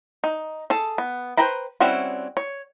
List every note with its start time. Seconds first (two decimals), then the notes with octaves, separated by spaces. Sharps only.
0.24 D#4
0.70 G#4 A4 A5
0.98 B3
1.37 B4 C5 G5 A#5 B5
1.80 G3 C4 C#4 E4 F#4
2.37 C#5